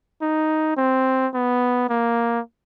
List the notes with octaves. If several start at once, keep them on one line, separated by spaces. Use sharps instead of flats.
D#4
C4
B3
A#3